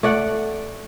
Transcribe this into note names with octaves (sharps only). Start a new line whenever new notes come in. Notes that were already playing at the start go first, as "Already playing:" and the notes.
A3 D5 F#5